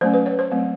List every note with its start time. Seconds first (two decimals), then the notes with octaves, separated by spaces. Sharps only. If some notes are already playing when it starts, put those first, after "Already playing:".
0.01 F#3 A3 C#4 C5
0.14 B4
0.26 C#5
0.39 C5
0.51 F#3 A3 C4